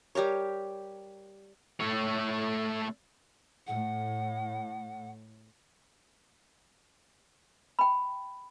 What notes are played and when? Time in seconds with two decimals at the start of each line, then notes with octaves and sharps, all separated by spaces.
0.15 G3 G4 A#4 C#5
1.80 A3 C#5
3.67 A2 F#5
7.79 G5 B5